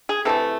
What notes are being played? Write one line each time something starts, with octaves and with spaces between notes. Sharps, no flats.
G#4
C3 E3 A3 A4